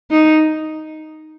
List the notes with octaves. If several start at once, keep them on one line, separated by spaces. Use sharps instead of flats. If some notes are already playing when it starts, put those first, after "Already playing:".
D#4